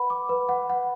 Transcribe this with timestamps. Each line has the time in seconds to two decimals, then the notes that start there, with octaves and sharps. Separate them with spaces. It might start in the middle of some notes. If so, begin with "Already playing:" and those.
Already playing: B4 F#5 B5
0.10 D6
0.29 B4
0.49 F#5
0.70 F#5